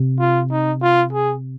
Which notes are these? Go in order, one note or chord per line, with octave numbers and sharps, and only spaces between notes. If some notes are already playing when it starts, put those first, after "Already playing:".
Already playing: C3
F4
D#4
F4
G#4